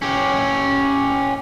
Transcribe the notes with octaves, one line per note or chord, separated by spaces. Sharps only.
C#4 G4